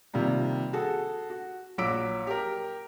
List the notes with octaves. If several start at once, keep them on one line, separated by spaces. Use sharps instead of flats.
C3 D#3 F3 G3 A#3
F#4 G#4 A4
F#4
A#1 F#3 D6 E6 B6 D7
G4 A#4